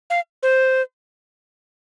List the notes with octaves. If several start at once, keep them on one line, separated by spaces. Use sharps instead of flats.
F5
C5